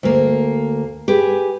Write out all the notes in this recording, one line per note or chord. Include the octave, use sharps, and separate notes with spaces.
D2 A#3
G4 G#4 B4